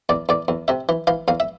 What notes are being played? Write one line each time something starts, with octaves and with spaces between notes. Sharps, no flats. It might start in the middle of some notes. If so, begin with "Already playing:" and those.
E2 D5
E2 D5
E2
C3 E5
E3
E3 F5
E2 F5
E5